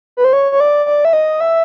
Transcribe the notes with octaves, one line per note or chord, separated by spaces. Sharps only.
B4
C5
C#5
C#5
D5
D5
E5
D#5
E5